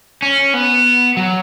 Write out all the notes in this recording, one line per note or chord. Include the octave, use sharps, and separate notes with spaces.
C#4
B3
F#3